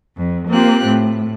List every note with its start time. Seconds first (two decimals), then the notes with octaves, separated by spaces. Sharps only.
0.17 F2
0.49 A#3 C4 F4 G4 F#6
0.87 A2